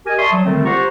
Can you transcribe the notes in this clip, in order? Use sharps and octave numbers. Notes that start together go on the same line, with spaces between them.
G4 A#4 D#5 G#5
D5 E5 A5 C6 C#6 D#6
F#3
D3 D#3 G3 A3 C4
F4 G4 C5 F#5 A#5 C#6